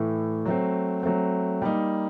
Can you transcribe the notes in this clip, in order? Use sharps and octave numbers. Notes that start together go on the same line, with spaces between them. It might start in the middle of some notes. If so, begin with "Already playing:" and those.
Already playing: A2 E3 A3
F#3 A3 C4
F#3 A3 C4
G3 A#3 D#4